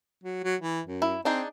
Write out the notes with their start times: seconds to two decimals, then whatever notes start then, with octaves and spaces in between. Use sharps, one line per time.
0.24 F#3
0.44 F#3
0.61 E3
0.86 F#2
1.02 E4
1.25 C4 D4 D#4 G#4